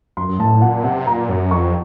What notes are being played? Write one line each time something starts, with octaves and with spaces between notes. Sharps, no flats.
F#2 C6
F#2
A2 A5
A#2 F#5
C3 F#5
A#2 A#5
F#2
F2 C#6